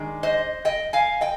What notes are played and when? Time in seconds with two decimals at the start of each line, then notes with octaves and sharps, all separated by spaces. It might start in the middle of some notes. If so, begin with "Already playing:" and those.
Already playing: D#3 G#3 D4
0.23 C5 D#5
0.65 D#5 G5
0.93 F5 G#5
1.21 D#5 G5